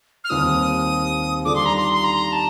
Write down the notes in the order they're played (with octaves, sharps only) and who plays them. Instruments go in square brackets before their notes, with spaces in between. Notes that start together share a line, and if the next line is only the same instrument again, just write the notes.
[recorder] F6
[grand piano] D#2 D#3 G3 C4 F4 [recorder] D#6
[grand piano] D#3 G3 D4 F4 A4 [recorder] D6
[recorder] C6
A#5
C6
C6
A#5
A5